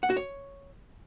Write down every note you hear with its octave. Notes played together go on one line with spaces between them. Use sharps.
F#5
F#4
C#5